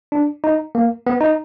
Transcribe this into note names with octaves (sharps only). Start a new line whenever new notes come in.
D4
D#4
A#3
B3
D#4